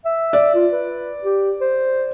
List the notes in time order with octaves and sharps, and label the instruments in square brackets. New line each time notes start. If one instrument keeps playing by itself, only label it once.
[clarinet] E5
[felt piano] D5
[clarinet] F4
B4
G4
C5